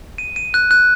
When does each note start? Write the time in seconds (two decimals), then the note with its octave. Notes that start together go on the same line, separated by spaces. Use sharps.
0.18 D#7
0.36 D#7
0.54 F#6
0.71 F#6